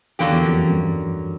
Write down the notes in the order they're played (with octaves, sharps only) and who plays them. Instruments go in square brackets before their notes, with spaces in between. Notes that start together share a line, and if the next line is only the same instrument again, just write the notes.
[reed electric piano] E2 [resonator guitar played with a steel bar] D3 F#3 A#3 D4 G4
[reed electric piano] E2
F2
F#2
G2